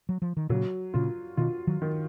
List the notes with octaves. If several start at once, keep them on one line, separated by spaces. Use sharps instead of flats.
F#3
F3
D#3
A#2 C#3 F#3
A#2 C#3 F4
B2 D#3 F4
D#3 F#3
D#3